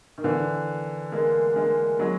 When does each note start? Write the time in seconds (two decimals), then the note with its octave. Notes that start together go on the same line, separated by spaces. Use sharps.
0.18 D#3
0.24 D3 E3
1.12 G#3 A#3
1.56 G#3 A#3
1.99 F#3 G#3